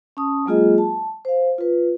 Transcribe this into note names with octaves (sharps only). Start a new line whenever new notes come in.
C#4 A5 D#6
F#3 G#3 A#3 F4 G#4 D#5
A5
C5 F5
F4 B4